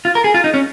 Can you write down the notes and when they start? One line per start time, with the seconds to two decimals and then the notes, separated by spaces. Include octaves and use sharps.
0.05 F4
0.15 A#4
0.24 G#4
0.34 F4
0.44 D#4
0.54 C#4